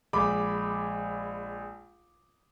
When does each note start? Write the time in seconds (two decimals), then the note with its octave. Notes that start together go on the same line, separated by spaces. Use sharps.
0.13 A#1 G#3 B5 D6